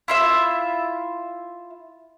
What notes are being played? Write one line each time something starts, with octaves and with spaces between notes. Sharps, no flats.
E4 F4 E5